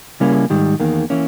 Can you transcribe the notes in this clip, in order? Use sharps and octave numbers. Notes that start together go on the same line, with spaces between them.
C#3 G3 A#3 C#4 E4
G#2 D#3 G3
E2 D#3 A#3
E3 A#3 C#4